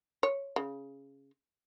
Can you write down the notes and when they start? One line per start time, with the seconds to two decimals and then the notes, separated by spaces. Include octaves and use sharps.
0.23 C#5
0.56 C#3